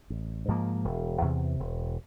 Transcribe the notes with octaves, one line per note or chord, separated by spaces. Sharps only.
A1
G#2 F3 A#3
E1
E2 C3
E1